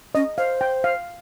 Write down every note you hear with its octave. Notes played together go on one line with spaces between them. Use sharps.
C#4 D#5
C5 F5
G5
F5